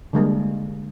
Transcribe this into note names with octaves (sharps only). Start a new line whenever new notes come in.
D3 G3 G#3 A#3